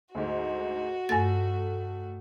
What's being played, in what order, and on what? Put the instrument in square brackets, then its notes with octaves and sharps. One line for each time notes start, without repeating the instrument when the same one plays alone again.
[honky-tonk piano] D2 G#2 [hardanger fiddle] F#4
[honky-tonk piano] F1 A3 [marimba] G2 A6